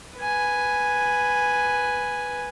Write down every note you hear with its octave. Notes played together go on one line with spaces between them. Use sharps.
B4 G#5